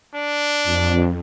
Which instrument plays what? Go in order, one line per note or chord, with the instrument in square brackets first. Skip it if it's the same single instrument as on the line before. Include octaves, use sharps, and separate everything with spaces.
[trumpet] D4
[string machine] F2